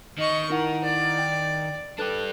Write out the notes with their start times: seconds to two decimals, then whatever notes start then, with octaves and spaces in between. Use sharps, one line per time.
0.19 D#3 D#5 C#6
0.50 D#4 E4 A#4 F#5
0.85 D5
1.19 G5
1.99 D4 G4 A4 B4 F#6